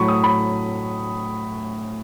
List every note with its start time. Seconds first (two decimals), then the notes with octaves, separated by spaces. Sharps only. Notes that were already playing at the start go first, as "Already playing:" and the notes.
Already playing: A2 F#3 A3 B5 C#6
0.08 D#6
0.24 B5